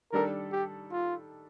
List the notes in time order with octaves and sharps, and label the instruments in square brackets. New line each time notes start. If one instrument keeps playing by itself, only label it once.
[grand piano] D#3 G3 D4 A4 [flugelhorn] A#4
[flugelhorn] G4
F4